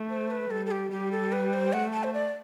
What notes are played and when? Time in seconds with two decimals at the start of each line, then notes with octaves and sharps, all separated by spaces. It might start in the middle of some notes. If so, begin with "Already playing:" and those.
Already playing: A3
0.10 C5
0.31 B4
0.50 G3 A4
0.66 A4
0.71 G4
0.91 G3 G4
1.12 A4
1.32 B4
1.53 C5
1.73 A3 F#5
1.93 A5
2.04 C5
2.14 D5